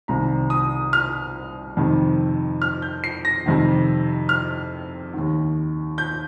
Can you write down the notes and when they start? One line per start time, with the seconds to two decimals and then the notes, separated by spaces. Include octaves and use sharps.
0.08 C2 C3 D#3 A#5
0.50 D#6
0.93 F6
1.77 F2 C3 D#3
2.62 F6
2.82 G6
3.04 C7
3.25 A#6
3.46 F2 C3 D#3
4.29 F6
5.14 D#2 D#3
5.98 G6